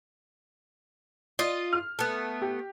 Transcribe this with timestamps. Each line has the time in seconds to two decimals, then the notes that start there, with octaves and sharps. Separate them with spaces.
1.39 F4 D#5
1.73 F6
1.99 A3 B3
2.42 G4